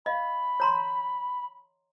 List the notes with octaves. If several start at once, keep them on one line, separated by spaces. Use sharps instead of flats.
D#5 F5 B5
C#5 A#5 C6